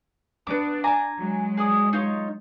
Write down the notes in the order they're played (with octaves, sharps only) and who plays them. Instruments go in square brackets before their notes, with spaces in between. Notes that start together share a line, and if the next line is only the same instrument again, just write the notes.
[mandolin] B3 D6 [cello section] D4 D5
[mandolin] G#5 A#5 D6
[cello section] F#3 G#3
[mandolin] G#4 D5 D#6
D#4 F4 C#5